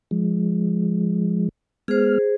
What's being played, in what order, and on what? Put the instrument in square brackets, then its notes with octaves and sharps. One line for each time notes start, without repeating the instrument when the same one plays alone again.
[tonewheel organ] F3 G#3
[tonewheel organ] G#3 B3 F6 [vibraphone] G#4 C5